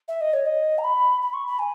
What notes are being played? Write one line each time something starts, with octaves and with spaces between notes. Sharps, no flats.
E5
D#5
C#5
D#5
A#5
B5
B5
C#6
B5
G#5